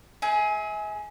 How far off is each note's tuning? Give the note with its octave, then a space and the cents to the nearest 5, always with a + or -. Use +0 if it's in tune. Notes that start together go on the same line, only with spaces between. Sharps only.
G#4 +10 E5 -40